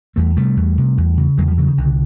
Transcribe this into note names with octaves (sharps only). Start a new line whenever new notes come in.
E2 G3 A3
C3 G3 A3
E2
C3
E2
C#3
E2 F#3 G#3
F3 G3
C#3 E3 F#3
D3
D#3
C2 D3